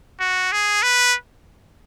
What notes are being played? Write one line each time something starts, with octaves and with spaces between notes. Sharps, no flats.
F#4
G#4
B4